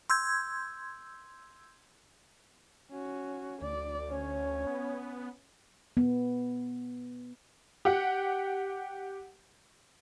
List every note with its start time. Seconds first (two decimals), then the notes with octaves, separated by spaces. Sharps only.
0.10 C6 E6 G6 G#6
2.91 C#4 F#4
3.62 D2 D5
4.10 C#4 C#5
4.67 B3
5.97 B3
7.85 G4 F#5